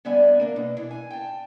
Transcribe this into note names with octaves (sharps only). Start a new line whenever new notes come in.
D3 G3 B3 D5 E5 G#5
A#3 D4
B2
E3 D4
G#5
G5 A5